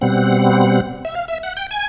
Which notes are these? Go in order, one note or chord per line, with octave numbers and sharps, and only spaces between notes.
B2 G3 C4 F#5
E5
F5
E5
F#5
G5
G#5